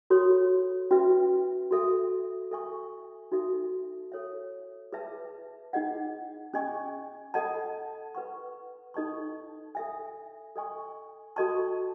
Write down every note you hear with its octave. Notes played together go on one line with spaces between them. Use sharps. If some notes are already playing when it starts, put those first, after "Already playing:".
F#4 A4 C#5
C#4 F#4 B4 E5
F#4 A4 E5
A4 E5 G#5 C#6
D#4 F#4 A4 E5
A4 C#5 E5
G#4 B4 E5 A5
D#4 G#4 D#5 F#5
C#4 G#4 D#5 G#5 C#6
A4 D#5 F#5 A5
B4 F#5 C#6
D#4 A4 D#5 A5 C#6
A4 E5 G#5
A4 D#5 G#5 C#6
F#4 A4 D#5 A5 C#6